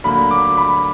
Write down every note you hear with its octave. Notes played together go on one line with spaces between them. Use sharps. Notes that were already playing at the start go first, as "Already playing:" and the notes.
D2 D3 F#3 A#3 B5
D6
B5